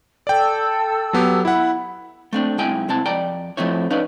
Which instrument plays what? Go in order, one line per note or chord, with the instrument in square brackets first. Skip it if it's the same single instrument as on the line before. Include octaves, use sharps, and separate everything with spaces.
[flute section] A4 E6 [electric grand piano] D5 G5
[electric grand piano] F#3 B3 G4
[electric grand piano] E4 F#5 [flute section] B5
[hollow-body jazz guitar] A3 C4 D4
B1 G#3 C4 E4 G5 G#5
C2 C4 E4 A5
F2 D5 G5 A#5
F2 F3 A3 C4 E4 C#5
C#4 D#4 B4 D5 F5